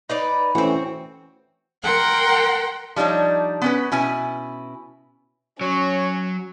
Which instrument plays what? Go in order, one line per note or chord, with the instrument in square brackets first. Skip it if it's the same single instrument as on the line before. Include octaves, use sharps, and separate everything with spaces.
[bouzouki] D#4 B4 D5
[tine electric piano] E3 A3 C#4 [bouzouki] C4 F#4
[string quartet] A#4 F#5 G5 C6
[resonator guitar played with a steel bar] F3 G3 D4 D#4 C#5
B3 C#4 B4
B2 C#4 E4 G#5
[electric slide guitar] F#3 [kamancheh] C#4 [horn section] C#5